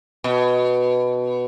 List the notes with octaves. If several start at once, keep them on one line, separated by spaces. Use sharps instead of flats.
B2